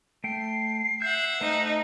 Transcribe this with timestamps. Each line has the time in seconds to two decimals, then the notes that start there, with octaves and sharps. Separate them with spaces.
0.24 A3 G5 C7
1.02 E5 F#5 G6
1.41 A3 D#4 C5